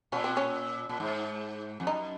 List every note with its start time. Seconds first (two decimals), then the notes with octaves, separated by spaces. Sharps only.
0.12 A#2 C#4
0.24 C4
0.37 C#4
0.89 A#2
1.00 G#2
1.80 F2
1.87 F#2 D#4